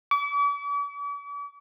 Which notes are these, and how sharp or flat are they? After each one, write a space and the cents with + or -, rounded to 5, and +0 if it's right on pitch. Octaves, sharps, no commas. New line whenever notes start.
D6 -45